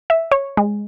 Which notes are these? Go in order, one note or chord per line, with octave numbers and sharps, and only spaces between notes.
E5
C#5
G#3